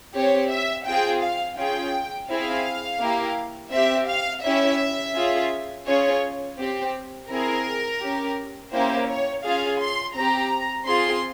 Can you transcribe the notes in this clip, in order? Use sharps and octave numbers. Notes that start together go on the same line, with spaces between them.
C4 G4 C#5
E5
C4 F4 G#4 G5
F5
C#4 F4 G#4 G5
C4 E4 G#4 F5
A#3 E4 G4
C4 G4 E5
F5
C#4 E4 G4 E5
C#4 F4 G#4
C#4 F4 G#4 C#5
C4 G4
C4 E4 G#4 A#4
C#4 G4
A#3 C#4 E4 G4 C5
C#5
C#4 F4 G#4 F5
C6
C4 G4 A#5
C4 F4 G#4 C6